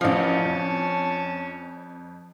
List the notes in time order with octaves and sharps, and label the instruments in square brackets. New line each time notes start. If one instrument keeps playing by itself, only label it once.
[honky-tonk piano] A1 F5 [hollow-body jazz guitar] F3 D4 [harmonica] C#4 A5
[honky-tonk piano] F2